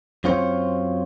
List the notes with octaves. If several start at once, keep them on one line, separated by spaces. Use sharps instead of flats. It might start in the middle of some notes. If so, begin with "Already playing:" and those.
F#2 C4 F4 C5 C#5